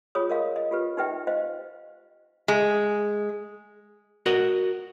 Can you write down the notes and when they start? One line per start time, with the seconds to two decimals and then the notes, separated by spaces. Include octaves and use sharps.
0.15 F4 G#4 C#5 D#6
0.30 A#4 D#5 F5
0.56 D#5
0.71 F4 G4 B4
0.97 D#4 G4 B4 E5 G5
1.27 C5 D#5 F5
2.48 G#3
4.26 F#4 A#4 D#5